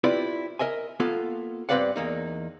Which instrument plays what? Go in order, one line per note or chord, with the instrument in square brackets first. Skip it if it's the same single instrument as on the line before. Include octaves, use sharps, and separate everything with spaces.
[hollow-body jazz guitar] C4 E4 F4 G4 B4 D5
A#4 D#5 E5 G#5
A#3 B3 F4 A4
G2 C4 B4 D5 F5 F#5
E2 A#3 D#4